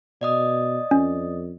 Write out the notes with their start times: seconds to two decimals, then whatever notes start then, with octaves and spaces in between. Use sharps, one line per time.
0.21 B2 D5 D#5 D#6
0.91 F2 C#4